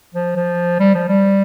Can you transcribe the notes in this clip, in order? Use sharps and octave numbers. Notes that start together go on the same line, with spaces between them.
F3
F3
G3
F3
G3